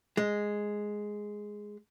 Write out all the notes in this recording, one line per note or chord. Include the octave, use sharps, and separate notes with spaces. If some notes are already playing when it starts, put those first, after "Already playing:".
G#3